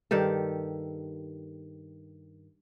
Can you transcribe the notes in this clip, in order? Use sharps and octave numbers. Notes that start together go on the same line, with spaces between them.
G2 D#3 G4 A4